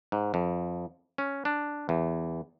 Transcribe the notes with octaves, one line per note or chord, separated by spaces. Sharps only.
G#2
F2
C#4
D4
E2